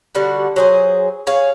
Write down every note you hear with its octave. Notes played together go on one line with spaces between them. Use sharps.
D3 G3 F#4
F#3 G#4 C5
G#4 C#5 F5